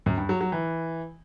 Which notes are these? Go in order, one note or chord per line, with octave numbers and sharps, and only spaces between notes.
F#2
G2
F#3
F#3
E3